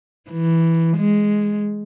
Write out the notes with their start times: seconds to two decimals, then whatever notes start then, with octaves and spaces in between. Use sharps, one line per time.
0.30 E3
0.97 G#3